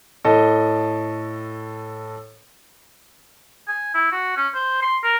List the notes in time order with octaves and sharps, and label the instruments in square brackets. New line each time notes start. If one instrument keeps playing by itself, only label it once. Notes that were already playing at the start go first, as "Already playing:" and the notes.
[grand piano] A2 A4 D#5
[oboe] G#5
E4
F#4
C#4
C5
C6
A#4